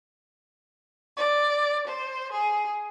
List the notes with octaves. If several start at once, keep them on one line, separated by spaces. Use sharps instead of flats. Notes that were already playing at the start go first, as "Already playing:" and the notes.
D5
C5
G#4